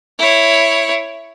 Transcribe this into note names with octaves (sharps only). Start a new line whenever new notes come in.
E4 C#5